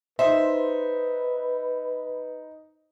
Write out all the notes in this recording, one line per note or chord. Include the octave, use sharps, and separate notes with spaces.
D#4 B4 C5 E5